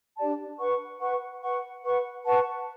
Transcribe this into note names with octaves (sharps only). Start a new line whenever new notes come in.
D4 G4 D5 A5
B4 F#5 C#6
B4 F#5 C#6
B4 F#5 C#6
B4 F#5 C#6
B4 F#5 A5 C#6